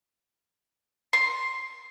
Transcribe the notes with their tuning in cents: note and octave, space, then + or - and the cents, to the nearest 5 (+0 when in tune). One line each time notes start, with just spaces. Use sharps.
C6 +5